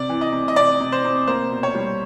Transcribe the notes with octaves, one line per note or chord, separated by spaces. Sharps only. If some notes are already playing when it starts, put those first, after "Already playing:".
Already playing: C3 D5
E3
D#5
C3
D#5
C3 D5
C3
C5
C3
A#3 C5
B2
C#5
G3